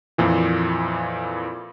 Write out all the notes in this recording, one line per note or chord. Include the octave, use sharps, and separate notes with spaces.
F2 A#2 E3